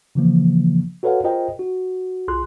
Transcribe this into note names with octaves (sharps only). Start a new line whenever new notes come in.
C#3 E3 F3 A#3
F#4 A4 B4 C#5 F5 F#5
F4 G#4 A#4 C5 D#5 G5
F#4
B1 F4 G#4 C6 F#6